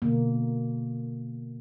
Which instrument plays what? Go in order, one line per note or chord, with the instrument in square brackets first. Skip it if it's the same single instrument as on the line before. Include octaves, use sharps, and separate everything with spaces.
[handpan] B2 D3 A#3